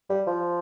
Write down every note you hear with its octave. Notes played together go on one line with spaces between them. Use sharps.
G3
F3